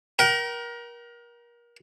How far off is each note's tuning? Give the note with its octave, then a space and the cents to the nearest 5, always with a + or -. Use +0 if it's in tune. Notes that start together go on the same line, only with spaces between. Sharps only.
A#4 +30 G5 -35